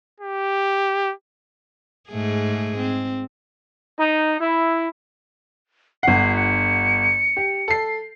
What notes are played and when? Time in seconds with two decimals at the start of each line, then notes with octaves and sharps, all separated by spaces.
0.20 G4
2.10 G#2 A3 G#4
2.79 C4
4.00 D#4
4.41 E4
6.03 G1 F#5 C7
6.36 C#7
7.37 G4
7.68 A4 C7